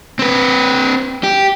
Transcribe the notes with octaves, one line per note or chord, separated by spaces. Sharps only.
C4 B4
G4